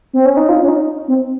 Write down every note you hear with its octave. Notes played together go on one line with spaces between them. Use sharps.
C4
C#4
D#4
F4
C#4
D#4
C4